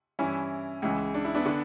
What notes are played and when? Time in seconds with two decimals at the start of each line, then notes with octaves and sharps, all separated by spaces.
0.19 G2 E3 C#4 E4
0.82 C#2 C#3 E3
1.14 D4
1.25 E4
1.34 B3 D4
1.46 D3